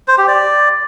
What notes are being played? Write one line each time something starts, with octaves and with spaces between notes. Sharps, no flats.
C5
G4
D5